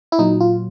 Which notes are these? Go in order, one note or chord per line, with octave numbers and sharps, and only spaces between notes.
E4
A#2 F#3 D#4
F4